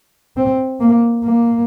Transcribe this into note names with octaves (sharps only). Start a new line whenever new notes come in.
C4
A#3
A#3